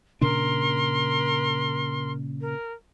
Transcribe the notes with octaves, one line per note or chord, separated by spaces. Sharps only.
A#2 C#3 D4 A#4 C6
A#4